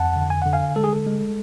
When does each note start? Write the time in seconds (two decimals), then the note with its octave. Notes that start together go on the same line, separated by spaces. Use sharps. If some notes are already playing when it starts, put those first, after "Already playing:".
Already playing: F2 F#5 A5
0.16 D3
0.30 G#5
0.42 D3 F#5
0.53 F5 G#5
0.76 G#3 A4
0.84 G#4
0.93 A4
1.06 G#3